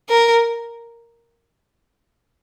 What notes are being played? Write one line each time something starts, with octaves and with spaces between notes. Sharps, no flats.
A#4